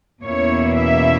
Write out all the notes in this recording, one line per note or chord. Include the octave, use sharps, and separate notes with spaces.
E2 B2 A#3 C#4 E4 C#5
E5